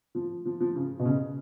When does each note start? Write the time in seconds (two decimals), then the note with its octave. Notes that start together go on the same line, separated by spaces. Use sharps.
0.15 F3
0.45 F3
0.60 F3
0.75 C#3
0.99 B2
1.05 C#3